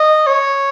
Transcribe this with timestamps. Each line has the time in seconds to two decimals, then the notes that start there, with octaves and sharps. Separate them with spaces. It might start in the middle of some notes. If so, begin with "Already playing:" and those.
Already playing: D#5
0.26 C#5